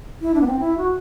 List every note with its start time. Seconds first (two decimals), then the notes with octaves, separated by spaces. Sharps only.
0.22 E4
0.34 D4
0.41 B3
0.47 C4
0.59 E4
0.78 F#4